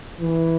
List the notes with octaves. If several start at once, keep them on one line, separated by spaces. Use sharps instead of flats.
E3